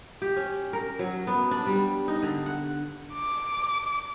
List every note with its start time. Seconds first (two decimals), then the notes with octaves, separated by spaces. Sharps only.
0.22 G4
0.37 C#4
0.73 A#4
0.99 F#3
1.27 B3
1.51 D4
1.67 G3
2.08 D#4
2.23 D3
2.46 F#5
3.13 D6